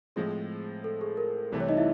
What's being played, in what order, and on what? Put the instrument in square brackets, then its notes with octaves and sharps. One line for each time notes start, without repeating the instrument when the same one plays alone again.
[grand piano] A2 F3 G#3 C4 [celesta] G#4
[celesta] A4
G#4
A#4
[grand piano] C2 C3 E3 A3
[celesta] C#5
D#4 D#5
E4 E5